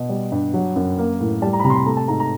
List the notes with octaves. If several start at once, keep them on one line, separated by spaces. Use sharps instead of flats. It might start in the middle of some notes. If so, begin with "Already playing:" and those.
Already playing: B2
G3
G2
F#3
F#2
A#3
A2
G3 A5
A#5
B5
C3 A#5
C6
B5
A3 A#5
A5
G#2 A#5
A#5